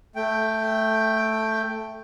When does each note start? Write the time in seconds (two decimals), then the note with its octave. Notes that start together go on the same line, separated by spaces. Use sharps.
0.16 A3 G5